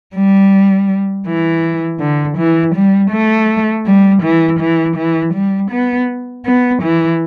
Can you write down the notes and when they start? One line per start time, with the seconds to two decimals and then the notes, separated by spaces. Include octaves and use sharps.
0.15 G3
1.27 E3
2.00 D3
2.38 E3
2.75 G3
3.11 A3
3.86 G3
4.23 E3
4.60 E3
4.97 E3
5.34 G3
5.71 B3
6.46 B3
6.83 E3